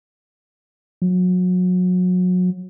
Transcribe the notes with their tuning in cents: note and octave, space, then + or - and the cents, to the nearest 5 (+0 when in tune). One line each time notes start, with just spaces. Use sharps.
F#3 -30